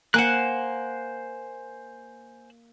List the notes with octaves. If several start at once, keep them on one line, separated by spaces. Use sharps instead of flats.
A#3 C5 F#5 G#5 F#6